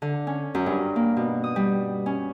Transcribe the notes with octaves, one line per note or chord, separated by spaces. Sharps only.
D3
C#4
F#2
G2
A#3
B2
D#6
G3
C#4